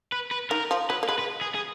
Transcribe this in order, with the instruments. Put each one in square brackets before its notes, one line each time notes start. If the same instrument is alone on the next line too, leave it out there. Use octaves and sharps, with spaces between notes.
[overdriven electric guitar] B4
B4
[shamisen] D#3 [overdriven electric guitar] A#4
[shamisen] F3
[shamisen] F#3 [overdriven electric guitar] B4
[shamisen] A#3
[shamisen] G#3 [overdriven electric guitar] B4
[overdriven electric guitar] B4
G#4
G#4